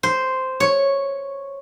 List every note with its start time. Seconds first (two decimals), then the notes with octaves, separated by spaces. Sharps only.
0.03 C5
0.60 C#5